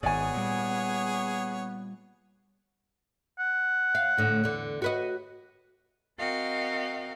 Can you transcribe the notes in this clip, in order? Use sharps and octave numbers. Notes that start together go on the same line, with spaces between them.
G#1 G#2 B3 G#4 C#5 D5 G#5
A#2 G3
F#5
F5
D2 A2 D3
E2 D3
F#4 B4 D#5
C4 F#4 A#4 D#5 F5 G5